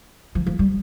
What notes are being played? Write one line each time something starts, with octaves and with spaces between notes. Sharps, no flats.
F3
F3
G3